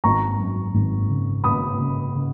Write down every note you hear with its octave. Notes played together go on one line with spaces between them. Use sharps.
G#1 A#5 C#6
F#2
G#1
C#3
G#1 B5 D#6
C#3
C#3